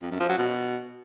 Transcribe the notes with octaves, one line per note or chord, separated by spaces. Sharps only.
F2
F#2
F3
F#3
B2